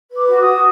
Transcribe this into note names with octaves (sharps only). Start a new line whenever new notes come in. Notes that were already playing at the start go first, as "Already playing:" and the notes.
B4
D6
F#4
F#4 D#6